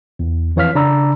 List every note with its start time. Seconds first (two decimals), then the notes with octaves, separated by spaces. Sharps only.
0.19 E2
0.56 F2 E3 C#5 F5 F6 B6
0.75 C#3 D4 D5 A#5 B5 E6